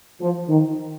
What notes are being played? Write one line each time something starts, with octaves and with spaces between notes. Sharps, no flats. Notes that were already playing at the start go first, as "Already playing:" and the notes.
F3
D#3